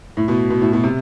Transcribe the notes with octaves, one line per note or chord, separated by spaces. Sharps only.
A2
B2
B2
A2
B2
C3